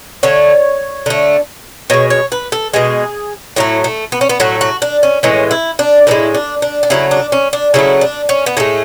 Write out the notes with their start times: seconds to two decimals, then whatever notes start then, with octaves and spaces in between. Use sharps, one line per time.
0.23 D3 A3 C#5
1.06 D3 A3
1.90 B2 G#3 C#5
2.10 C#5
2.32 B4
2.52 A4
2.74 B2 G#3 G#4
3.56 A2 F#3 A3 E4
3.84 A3
4.12 B3
4.21 C#4
4.29 B3
4.40 A2 F#3 A3 F#4
4.61 F#4
4.82 D4
5.03 C#4
5.23 A2 E3 G#3 C#4
5.51 E4
5.79 D4
6.07 A2 E3 G#3 E4
6.34 D4
6.62 D4
6.83 D4
6.90 C#3 F#3 A3 E4
7.11 D4
7.32 C#4
7.53 D4
7.74 C#3 F#3 A3 E4
8.01 D4
8.29 C#4
8.46 B3
8.57 A2 G#3 A3